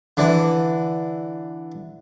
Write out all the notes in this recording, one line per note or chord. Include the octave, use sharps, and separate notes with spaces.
D3 E3